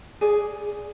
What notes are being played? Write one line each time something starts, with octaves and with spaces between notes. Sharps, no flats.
G#4 D5